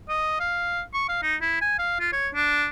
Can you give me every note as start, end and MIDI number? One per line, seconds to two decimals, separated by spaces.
0.09 0.37 75
0.40 0.82 77
0.94 1.04 85
1.09 1.22 77
1.22 1.36 63
1.41 1.61 64
1.61 1.76 80
1.79 1.97 77
2.00 2.08 65
2.12 2.28 73
2.34 2.68 62